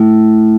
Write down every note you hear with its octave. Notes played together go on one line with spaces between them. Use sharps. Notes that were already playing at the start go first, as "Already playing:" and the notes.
Already playing: A3 E4